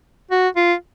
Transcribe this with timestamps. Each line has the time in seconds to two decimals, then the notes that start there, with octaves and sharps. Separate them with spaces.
0.31 F#4
0.56 F4